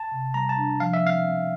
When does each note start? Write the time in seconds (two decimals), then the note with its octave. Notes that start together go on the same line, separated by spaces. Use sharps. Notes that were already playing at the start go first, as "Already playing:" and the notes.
Already playing: A5
0.12 C3
0.34 G3 A#5
0.49 A5
0.56 D4
0.80 F3 F5
0.93 E5
1.02 C4 F5
1.26 C4